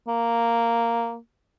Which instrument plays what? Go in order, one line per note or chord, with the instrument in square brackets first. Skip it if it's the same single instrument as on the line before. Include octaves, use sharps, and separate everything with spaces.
[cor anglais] A#3